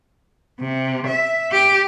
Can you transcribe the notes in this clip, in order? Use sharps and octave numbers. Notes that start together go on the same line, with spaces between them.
C3
E5
G4